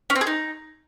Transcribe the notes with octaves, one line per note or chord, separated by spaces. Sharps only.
C#4
C4
G#4
D#4